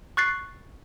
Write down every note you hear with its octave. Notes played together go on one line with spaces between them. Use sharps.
C#6 F#6 A6 C7